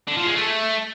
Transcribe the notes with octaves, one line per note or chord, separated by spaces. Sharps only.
D3
F3
G#3
A3